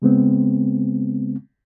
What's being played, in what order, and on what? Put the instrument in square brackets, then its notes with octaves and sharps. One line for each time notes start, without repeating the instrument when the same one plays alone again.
[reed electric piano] C#3 G#3 B3 C4